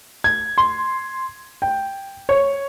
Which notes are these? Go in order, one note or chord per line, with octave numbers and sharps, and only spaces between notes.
G#6
C6
G5
C#5